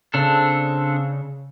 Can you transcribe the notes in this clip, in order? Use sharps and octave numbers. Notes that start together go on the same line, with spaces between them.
C#3 C4 D4 A4